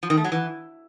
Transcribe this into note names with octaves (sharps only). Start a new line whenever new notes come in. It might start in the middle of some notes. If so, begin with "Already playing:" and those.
F3
D#3
A3
F#3
E3